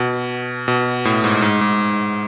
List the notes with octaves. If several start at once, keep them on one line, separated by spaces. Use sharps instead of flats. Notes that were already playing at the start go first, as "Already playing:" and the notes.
Already playing: B2
B2
A2
G#2
G#2
G#2